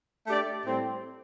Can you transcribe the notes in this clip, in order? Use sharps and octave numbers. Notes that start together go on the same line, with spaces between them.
A3 D4 G4 D5
A2 G3 C4